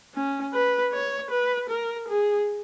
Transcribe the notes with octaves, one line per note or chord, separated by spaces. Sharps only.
C#4
B4
C#5
B4
A#4
G#4